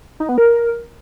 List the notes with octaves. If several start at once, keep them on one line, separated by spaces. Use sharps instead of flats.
D#4
B3
A#4